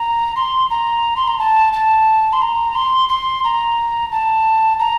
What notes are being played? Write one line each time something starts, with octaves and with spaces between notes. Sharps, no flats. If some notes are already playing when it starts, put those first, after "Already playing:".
Already playing: A#5
C6
A#5
C6
A#5
A5
A5
C6
A#5
C6
C6
A#5
A5
A#5